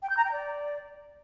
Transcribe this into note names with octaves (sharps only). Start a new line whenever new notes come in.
G5
G6
A#5
G5
D5